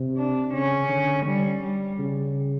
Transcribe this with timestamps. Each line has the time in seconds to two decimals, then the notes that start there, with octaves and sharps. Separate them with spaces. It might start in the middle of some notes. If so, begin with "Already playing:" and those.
Already playing: C3
0.16 D4
0.53 C#3 C#4
0.89 D3
1.25 G3
1.62 G3
1.99 C#3